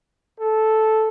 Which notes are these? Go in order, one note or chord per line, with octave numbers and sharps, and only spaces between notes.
A4